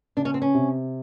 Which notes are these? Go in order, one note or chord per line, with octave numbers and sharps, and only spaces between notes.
C#3 D4
C#4
C4
C#4
C3